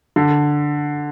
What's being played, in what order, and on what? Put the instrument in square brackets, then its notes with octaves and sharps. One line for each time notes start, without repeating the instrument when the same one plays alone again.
[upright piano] D3